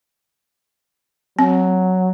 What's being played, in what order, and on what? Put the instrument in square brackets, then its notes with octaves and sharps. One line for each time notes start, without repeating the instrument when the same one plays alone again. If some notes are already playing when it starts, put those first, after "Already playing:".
[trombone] F#3 [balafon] C4